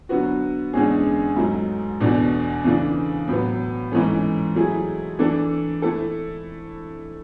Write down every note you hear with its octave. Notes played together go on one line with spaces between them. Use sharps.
D3 F#3 B3 F#4
E2 D3 G#3 C#4 G#4
G#2 F#3 A3
E2 B2 A3 D4
C#3 E3 A3 D4
A2 F#3 B3
G#2 E3 A3 C#4
F#3 A3 E4 G#4
E3 A3 D4 A4
A3 E4 A4